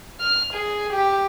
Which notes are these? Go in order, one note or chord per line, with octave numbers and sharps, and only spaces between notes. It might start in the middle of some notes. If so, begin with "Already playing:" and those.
F6
G#4
G4